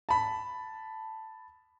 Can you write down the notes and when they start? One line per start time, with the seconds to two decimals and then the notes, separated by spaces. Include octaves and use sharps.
0.09 A5 B5